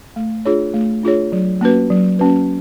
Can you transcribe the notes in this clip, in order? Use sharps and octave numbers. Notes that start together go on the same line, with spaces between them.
A3
D4 F4 G#4 C#5
A3
D4 F4 G#4 C#5
F#3
A#3 C#4 F#4 B4
F#3
A#3 C#4 F#4 B4